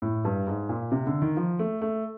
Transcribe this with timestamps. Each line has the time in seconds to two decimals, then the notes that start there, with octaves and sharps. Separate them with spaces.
0.02 A2
0.25 G2
0.47 G#2
0.69 A#2
0.92 C3
1.07 D3
1.22 D#3
1.37 F3
1.59 A3
1.82 A3